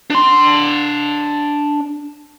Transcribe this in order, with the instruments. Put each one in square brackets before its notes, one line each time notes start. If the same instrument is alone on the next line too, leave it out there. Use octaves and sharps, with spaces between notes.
[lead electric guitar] D4 C6